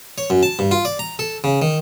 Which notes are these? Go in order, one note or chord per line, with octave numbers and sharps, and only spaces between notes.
C#5
F#2
A5
G2
F4
D5
A#5
A4
C#3
D#3